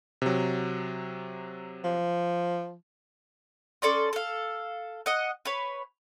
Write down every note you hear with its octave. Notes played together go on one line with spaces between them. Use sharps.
C3 F#3
F3
C#4 A4 D5 C6
A4 F5
D#5 F#5
B4 C#5